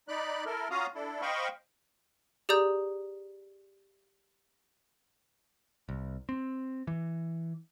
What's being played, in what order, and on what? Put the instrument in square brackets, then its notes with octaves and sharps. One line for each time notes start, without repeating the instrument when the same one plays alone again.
[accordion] D#4 D5 B5 F#6
E4 A4 A#4
C#4 F4 F#4 F5 A#5 D#6
D4 E4 A4
C5 D#5 F5 G5 B5 C#6
[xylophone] G4 G#4 D5 A#5 D#6 G6
[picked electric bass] C2
C4
E3